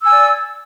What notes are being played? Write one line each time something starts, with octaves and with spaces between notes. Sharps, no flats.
D5 G#5 E6